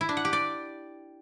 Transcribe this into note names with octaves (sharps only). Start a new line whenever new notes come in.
E4
D4
F#5
G4
D5